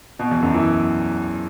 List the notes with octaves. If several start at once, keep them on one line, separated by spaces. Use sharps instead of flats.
B2
E2
F#2
E3